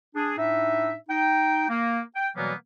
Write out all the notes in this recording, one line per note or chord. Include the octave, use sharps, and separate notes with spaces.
D4 G#4
A2 D4 D#4 E5
D#4 G5
A#3
G5
B2 E3 F#3 G3 A#3 B3